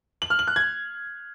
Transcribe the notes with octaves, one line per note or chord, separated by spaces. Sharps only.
F#7
F6
F#7
F#6
G#6